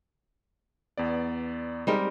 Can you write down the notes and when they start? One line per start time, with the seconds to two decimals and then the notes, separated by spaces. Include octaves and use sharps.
0.98 E2 B3 D5
1.87 G3 G#3 C4 D#4 G4 A#4